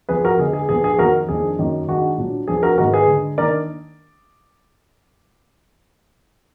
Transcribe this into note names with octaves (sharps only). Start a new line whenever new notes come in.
F2 F3 B3 G#4 B4
F#4 A#4
D3 G#3 B3 D#4 G#4
G#4
A#2 F3 B3 D4 G#4
G#4
F2 D#3 A#3 F#4 A#4
F2 D#3 A#3 D4 G#4
F#2 D#3 A#3 D#4
D#3 G#3 D4 F#4
A#2 F#3 D4
F2 F3 B3 D4 G#4
F#4 A#4
G#2 D#3 A#3 D#4 F#4 A#4
G#4 B4
D3 G#3 D#4
D#3 A#3 D4 A#4 D5